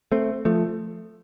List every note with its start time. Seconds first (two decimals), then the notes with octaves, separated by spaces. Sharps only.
0.12 A3 C4
0.45 F3 A3